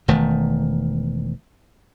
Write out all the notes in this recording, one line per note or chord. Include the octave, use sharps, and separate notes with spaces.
E1 D#3 A3